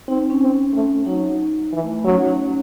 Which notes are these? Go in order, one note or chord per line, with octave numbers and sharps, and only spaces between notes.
C4 D#4
C4
C#4
C4
A3
F#3 D#4
E3
A3
A3
F#3 C#4
D#4
C#4